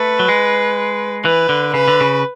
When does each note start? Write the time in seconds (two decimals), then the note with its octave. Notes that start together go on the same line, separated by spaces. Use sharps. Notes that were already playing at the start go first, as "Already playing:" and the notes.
Already playing: A3 B4
0.19 F#3
0.28 G#3
1.25 E3 B4
1.49 D3
1.74 C#3 B4
1.88 D3
2.01 C#3